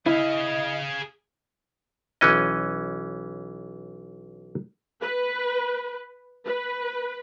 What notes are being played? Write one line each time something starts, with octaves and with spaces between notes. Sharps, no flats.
E4 G#4 D#5 F5
B1 E3 C#4 D#5
B4
B4